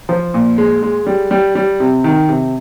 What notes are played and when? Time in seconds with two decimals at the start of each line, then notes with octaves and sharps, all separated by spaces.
0.09 F3
0.34 A#2
0.58 G#3
0.82 G#3
1.07 G3
1.31 G3
1.55 G3
1.80 C3
2.04 D#3
2.29 C3